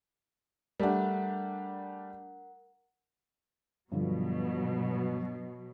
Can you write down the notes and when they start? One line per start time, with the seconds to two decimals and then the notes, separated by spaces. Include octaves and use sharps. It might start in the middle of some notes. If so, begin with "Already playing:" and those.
0.80 G3 A3 D4 A#4 F#5
3.92 G2 B2 D3 F3 F#3